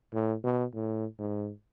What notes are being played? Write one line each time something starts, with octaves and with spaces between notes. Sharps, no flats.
A2
B2
A2
G#2